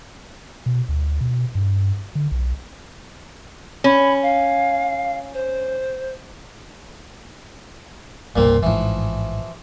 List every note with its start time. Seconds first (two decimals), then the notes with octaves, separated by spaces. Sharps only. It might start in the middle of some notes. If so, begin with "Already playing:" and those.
0.66 B2
0.89 D2
1.21 B2
1.55 G2
2.15 D3
2.31 B1
3.84 C#4 B5
4.22 F5
5.33 C5
8.36 E1 C2 G2 A#2 A#3 C4
8.63 A1 G#2 E3 F3